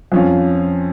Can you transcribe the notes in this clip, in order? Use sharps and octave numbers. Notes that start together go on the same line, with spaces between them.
F2 F3 C#4 F4